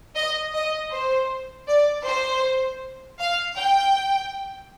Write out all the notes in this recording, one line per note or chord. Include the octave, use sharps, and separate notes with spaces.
D#5
D#5
C5
D5
C5
F5
G5